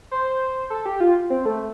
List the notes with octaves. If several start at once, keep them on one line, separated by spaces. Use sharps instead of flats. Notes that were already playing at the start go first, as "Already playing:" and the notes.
C5
A4
G4
F4
C4
A3